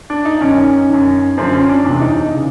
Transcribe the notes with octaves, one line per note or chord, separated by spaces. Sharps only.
D4
D#4
F#2 D#3 C#4
F#2 D#3
F#2 D3 F3 C4
C#4
D4
E2 C3 E3 D4
D#4
C#3 E3